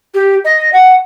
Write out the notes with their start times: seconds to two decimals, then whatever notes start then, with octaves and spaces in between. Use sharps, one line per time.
0.14 G4
0.45 D#5
0.73 F#5